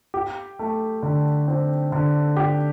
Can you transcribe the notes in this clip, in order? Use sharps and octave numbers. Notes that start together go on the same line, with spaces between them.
G4
A3
D3
C4
D3
G4